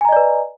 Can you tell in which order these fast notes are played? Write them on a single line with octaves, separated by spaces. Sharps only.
G#5 A#5 D#5 D5 B4